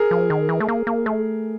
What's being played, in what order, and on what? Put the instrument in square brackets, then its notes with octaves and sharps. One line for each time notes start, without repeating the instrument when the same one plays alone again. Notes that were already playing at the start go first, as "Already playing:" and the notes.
Already playing: [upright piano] G#4 A#4
[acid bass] F3
D#3
E3
A3
A#3
A#3
A3